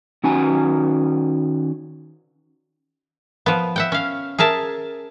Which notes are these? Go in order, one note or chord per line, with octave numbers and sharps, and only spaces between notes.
D#3 C#4 F#4 G#5
F3 B3
E5 F#5 G5
C#4 F5
G#4 A#4 E5 A5